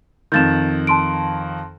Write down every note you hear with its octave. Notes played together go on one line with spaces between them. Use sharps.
F2 D#3 G6 A6 E7
A5 C6 D7